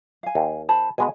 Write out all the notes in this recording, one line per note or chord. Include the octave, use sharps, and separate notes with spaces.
F5 G#5
D#2
C5 A5 B5
B2 G#3 B3 G#5